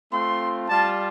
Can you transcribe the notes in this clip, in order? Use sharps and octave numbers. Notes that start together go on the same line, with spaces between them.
A3 C4 F4 C6
G3 F4 A5